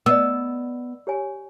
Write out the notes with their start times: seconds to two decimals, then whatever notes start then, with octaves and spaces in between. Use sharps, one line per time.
0.06 B3 D5 D#5 D#6 E6
1.07 G4 C#5 G#5